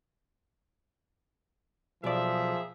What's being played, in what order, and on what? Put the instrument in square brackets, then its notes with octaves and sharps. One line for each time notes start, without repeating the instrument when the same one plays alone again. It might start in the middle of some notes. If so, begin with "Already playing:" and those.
[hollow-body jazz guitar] B1 D5 [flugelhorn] F3 [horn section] A#3 G#4 E5